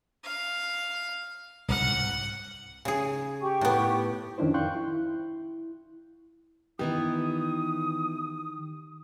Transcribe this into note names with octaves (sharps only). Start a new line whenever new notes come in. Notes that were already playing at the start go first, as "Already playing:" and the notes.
F5
C2 G#2 F#5 F6
C#3 G#4
G4 C#6
A2 B3
F2 D#3 C#4 D4 E4 C5
F5 G5 C6 C#6 F#6 G6
E4
D#3 E3 B3 D#4 E4 G4 D#6